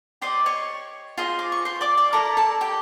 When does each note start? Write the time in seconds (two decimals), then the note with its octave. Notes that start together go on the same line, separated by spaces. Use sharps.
0.21 G4 C5 D5 D#5 D6
0.46 C#5 C#6
1.17 F4 G#4 C5 D#5
1.39 D6
1.52 C#6
1.65 C5 C6
1.81 D5 D6
1.97 D5 D6
2.13 E4 A4 A#4 D5 A#5
2.37 A4 A5
2.61 G4 G5